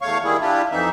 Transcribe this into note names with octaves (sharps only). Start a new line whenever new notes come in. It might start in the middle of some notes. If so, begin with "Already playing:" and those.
E2 A3 C#5 F5 C#6
D#3 G3 A#3 E4 G#4
G3 D4 E4 F4 G4
F2 E3 C4 D#4 E5